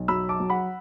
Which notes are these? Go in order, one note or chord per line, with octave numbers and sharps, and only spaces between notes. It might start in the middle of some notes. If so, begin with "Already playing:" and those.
Already playing: B1
F#3 B5 E6
A5 D6
F#3
F#5 B5